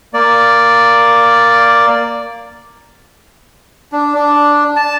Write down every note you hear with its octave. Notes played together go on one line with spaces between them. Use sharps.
A#3 D5
D4
D4
A5